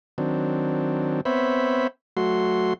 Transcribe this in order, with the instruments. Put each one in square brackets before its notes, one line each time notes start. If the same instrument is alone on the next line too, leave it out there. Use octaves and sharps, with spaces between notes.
[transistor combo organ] D#3 F#3 C4 D4
B3 C4 C5 C#5 E5 B5
F#3 A3 F#4 C6